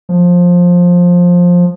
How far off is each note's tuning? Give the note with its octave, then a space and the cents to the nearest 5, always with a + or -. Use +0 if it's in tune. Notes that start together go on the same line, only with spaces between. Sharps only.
F3 +15